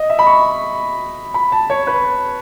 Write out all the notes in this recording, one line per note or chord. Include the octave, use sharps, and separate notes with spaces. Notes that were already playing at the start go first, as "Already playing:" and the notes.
Already playing: D#5
E5
B5
C#6
B5
A5
C#5
B4